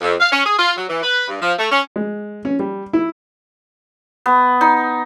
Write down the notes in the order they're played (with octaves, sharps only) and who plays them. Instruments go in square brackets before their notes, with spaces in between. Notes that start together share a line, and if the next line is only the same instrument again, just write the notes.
[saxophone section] F2
F5
C#4
G#4
F4
F#3
E3
B4
G2
F3
A3
C#4
[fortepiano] G#3
C#4
G3
E4
[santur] B3
D#4